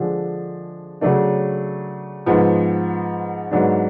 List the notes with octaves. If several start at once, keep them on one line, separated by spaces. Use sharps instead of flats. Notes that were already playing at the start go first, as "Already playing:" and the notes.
Already playing: D3 F3 G#3 D4
C#3 F#3 A3 D4
G#2 F3 B3
G#2 F#3 B3 D4